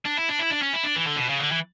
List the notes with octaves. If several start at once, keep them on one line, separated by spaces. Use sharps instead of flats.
D4
E4
D4
E4
D4
C#4
E4
D4
E3
D3
B2
C#3
D3
E3